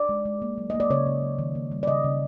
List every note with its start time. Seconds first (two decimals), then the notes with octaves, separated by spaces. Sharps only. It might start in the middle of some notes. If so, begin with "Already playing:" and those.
Already playing: D5
0.09 G#3
0.25 G#3
0.42 A#3
0.58 F#3
0.70 A#3 D#5
0.80 D5
0.90 C#3 C#5
1.06 C#3
1.23 F#3
1.39 D#3
1.55 A#3
1.72 G3
1.83 D5
1.87 C#3 D#5
2.04 C#3